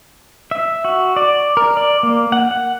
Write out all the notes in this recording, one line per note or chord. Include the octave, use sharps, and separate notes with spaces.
E5
F#4
D5
A#4
D5
A#3
F#5
F#5